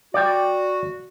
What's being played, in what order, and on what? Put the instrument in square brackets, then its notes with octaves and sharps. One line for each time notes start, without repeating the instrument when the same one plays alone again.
[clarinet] F#4 [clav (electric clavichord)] D5 G5